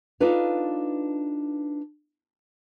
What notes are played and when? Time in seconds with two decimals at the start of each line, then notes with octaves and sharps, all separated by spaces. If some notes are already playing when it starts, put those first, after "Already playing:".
0.20 D4 D#4 F4 A4 B4 F5